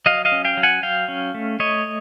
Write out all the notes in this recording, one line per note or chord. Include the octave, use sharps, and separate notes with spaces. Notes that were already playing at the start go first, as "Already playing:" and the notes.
F#3 D#5 F5
D#5 F5
C#4
F5 G5
F#3
F#5 G#5
F#3 F5 G5
C#4
A3
A3 C#5 D#5